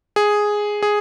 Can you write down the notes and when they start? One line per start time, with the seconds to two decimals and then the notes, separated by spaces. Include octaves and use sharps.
0.16 G#4
0.83 G#4